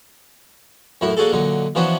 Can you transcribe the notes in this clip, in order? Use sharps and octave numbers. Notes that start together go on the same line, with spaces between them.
F#2 A2 E4 F#4
A#3 D4 F#4 G#4 A4
A#2 D3 F#3 D#4
E3 F3 B3 C#4 D4 F#4